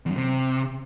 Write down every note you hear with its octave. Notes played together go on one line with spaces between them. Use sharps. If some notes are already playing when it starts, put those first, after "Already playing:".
E2
F#2
C3